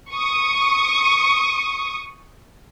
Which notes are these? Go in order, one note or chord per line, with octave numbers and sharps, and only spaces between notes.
C#6 D#6